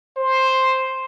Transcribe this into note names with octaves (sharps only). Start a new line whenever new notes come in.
C5